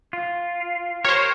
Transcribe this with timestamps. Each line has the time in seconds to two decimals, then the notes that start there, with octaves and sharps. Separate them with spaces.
0.13 F4
1.04 G4 A#4 C5 C#5